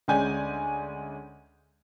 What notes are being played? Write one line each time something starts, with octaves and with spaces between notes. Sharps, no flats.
D2 G#3 C#4 D5 G#5 G6